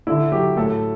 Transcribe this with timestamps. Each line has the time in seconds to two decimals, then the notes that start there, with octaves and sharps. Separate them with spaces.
0.07 D3 E4
0.32 F#3 G4
0.57 A2 A4